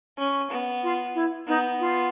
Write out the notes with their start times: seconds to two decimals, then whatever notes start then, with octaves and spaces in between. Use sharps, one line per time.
0.18 C#4
0.51 B3
0.83 F4
1.15 E4
1.48 B3 D#4
1.80 F4